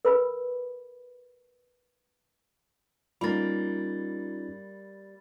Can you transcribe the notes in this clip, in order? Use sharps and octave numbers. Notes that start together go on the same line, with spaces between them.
A#4 B4 B5
G3 A#3 C#4 D#4 F4 B5 A6